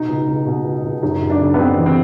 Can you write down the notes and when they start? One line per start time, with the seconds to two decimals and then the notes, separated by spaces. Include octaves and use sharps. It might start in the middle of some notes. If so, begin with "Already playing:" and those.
Already playing: B2 D#4
0.09 C#2
0.28 C#2
0.46 B2
0.65 C#2
0.84 C#2
1.03 F#2 D#4
1.21 F#2
1.30 D4
1.39 C#3
1.54 B3
1.59 F#1 C4
1.77 E3
1.86 C4